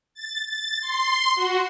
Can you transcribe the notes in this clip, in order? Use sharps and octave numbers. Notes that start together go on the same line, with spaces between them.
A6
A6
C6
F#4